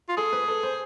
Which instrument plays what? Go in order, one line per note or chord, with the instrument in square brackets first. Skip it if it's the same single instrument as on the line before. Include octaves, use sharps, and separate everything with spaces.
[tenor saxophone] F4
[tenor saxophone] G#4 [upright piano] A4
[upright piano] B4
A4
C5